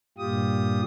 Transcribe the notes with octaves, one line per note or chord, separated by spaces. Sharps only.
G2 A#2 F4 G4 D#6